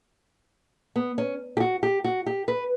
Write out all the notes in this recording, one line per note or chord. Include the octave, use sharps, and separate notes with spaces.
B3
C#4
G4
F#4
G4
F#4
G4
B4